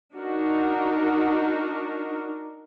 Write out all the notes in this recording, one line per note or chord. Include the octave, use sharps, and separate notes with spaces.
D4 D#4 F#4 A#4